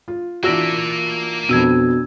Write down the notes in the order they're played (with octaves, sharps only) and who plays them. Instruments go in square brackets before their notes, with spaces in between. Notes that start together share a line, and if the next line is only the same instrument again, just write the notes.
[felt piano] F4
[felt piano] E3 D4 F#4 [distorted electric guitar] A#3 D5 [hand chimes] F4 E6 A#6
[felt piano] F2 D#7 [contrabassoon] B2 [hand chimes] D4 E6 G#6